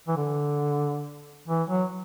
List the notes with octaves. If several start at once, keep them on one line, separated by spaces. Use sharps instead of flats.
E3
D3
E3
F#3